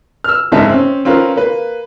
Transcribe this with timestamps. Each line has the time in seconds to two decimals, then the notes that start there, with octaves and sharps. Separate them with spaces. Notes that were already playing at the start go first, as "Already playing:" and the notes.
0.24 E6 F6
0.52 F#1 F2 G#2 G#3 E5 A5
0.69 C4 C#4
1.05 C4 C#4 F4 A#4 B4
1.36 A#3 B4